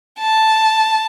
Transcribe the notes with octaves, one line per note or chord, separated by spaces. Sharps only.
A5